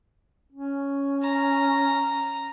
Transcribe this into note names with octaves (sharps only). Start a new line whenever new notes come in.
C#4
A#5